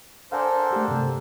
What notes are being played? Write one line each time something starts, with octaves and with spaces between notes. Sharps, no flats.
D4 A4 A#4 C5 F5 F#5 G#5
A3 G4
G2 C3